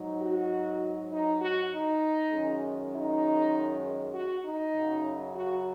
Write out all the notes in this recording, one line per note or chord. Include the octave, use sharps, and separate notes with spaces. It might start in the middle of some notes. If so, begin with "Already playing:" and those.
Already playing: G#2 F#3 D#4
F#4
D#4
F#4
D#4
F#2 D#3 G#3 C#4
D#4
F#4
D#4
F#2 C#3 F#3
F#4